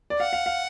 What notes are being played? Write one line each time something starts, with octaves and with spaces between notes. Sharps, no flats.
D5
F5 F#5
F5
F5